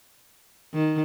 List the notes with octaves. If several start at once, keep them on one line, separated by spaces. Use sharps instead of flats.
D#3